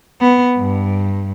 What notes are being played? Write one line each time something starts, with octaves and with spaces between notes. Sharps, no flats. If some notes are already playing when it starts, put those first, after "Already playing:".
B3
G2